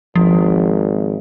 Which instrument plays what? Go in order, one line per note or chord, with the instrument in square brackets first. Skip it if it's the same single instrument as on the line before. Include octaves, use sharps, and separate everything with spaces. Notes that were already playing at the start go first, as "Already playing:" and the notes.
[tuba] G#1 [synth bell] F3